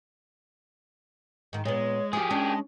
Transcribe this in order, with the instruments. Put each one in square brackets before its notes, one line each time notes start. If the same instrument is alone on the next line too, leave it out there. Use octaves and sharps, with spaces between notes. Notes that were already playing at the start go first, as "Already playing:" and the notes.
[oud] G#2 D#3
[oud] A#2 B3 [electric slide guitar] G#3 [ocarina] C#5
[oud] F3 [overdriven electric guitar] G4 G#4
[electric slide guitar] G#3 [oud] C#4 D4 [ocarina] A5